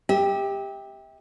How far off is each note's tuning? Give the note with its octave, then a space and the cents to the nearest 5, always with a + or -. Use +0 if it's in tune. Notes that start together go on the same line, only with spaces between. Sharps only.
G4 +15 E5 -35